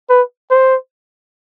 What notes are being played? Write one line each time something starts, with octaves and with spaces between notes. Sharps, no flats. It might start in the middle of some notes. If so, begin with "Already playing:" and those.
B4
C5